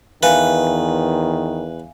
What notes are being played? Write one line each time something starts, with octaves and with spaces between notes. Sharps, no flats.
E2 D#3 B4 E5 F5 G#5